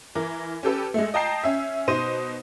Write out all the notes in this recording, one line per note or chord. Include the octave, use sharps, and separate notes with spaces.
E3 A#4
C#4 G4 A4 B4
G#3 A3
D#5 G5 A5 A#5 G6 C7
C#4 E5
B2 D#4 C5 D#7